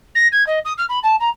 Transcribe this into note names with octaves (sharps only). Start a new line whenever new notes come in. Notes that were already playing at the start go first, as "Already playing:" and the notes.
A#6
G#6
D#5
D#6
F6
B5
A5
A#5